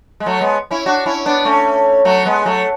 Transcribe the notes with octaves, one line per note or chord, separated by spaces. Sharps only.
G#3
F#3 A3
G#3 B3
C#4 E4
D4 F#4
C#4 E4
B3 D4
A3 C#4
F#3 A3
G#3 B3
F#3 A3